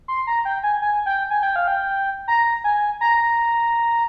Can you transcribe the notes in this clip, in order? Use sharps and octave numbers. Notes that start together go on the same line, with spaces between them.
C6
A#5
G5
G#5
G#5
G5
G#5
G5
F5
G5
A#5
G#5
A#5